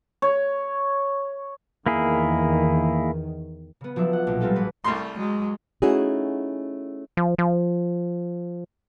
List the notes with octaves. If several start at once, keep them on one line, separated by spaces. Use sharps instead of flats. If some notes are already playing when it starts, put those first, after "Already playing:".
C#5
E2 D#3 A#3 E4 G#4
C#3 B3
F3 F#3 D4 E5
F#5
A#1 B2
G3 G#3 C4 F4 A4
A1 B4 F#5
C2 G3 A3 C6
F#3 G#3
A3 C#4 D#4 E4 F#4 G#4
F3
F3